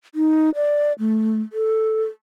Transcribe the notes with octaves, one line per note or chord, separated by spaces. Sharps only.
D#4
D5
A3
A4